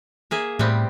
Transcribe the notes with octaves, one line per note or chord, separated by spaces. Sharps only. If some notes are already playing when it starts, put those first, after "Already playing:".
A#3 G#4 E5
A2 G3 B3 C4